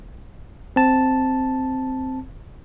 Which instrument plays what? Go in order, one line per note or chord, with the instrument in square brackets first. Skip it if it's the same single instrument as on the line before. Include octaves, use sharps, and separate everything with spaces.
[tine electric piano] C4 A5